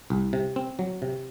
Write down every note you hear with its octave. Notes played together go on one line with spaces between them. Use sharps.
C2
C3
C4
F#3
C3